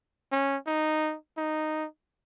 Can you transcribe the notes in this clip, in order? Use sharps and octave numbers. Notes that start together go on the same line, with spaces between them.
C#4
D#4
D#4